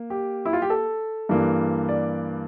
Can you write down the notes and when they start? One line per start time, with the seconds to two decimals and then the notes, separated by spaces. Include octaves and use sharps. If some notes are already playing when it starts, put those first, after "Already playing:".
Already playing: A#3
0.10 G4
0.45 E4
0.53 F4
0.62 G4
0.70 A4
1.29 G2 E3 A#3
1.89 D5